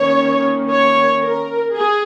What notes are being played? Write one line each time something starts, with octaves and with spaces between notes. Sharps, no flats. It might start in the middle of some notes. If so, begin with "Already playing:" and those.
Already playing: D#3 A#3 C#4 C#5
C#5
A#4
G#4